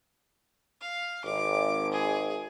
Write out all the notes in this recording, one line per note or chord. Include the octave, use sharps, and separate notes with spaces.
F5
G#1 D6
G#4